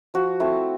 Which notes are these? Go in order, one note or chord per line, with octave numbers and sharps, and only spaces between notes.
F3 F#4
A3 C4 E4